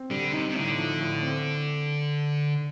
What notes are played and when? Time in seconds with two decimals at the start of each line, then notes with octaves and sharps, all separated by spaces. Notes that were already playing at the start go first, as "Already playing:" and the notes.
Already playing: C4
0.11 D3 G3
0.33 C3 D#4
0.50 C3
0.55 A2 D3
0.77 F3
1.01 A2
1.22 C4